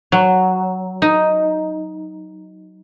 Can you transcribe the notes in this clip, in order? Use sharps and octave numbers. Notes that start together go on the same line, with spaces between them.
F#3
D#4